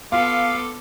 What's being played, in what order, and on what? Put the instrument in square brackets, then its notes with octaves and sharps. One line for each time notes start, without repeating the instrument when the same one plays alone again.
[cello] B3 A4 [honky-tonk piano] F4 [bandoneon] F5 [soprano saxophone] D6